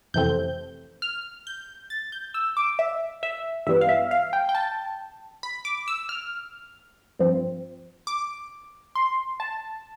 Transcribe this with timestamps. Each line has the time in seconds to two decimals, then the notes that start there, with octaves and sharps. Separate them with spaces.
0.14 F2 C3 E3 A3 C4 G6
1.02 F6
1.47 G6
1.90 A6
2.12 G6
2.34 E6
2.57 D6
2.79 E5
3.23 E5
3.67 G2 E3 G3 B3 E5
3.81 F5
3.89 E5
4.11 F5
4.33 G5
4.49 G5
4.55 A5
5.43 B5
5.65 D6
5.88 E6
6.09 F6
7.19 G2 F3 C4
8.07 D6
8.95 C6
9.40 A5